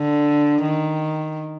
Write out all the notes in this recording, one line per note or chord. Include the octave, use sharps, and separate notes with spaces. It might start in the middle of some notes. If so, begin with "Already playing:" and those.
Already playing: D3
D#3